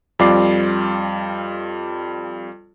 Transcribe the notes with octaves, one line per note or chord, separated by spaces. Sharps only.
F2 G3 F4 D5 D6 C7